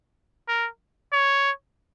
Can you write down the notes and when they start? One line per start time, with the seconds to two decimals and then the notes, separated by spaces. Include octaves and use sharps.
0.48 A#4
1.13 C#5